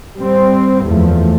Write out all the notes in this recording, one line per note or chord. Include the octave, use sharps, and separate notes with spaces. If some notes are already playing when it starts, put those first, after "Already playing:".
G3 C4
F#1 E2 F3 A3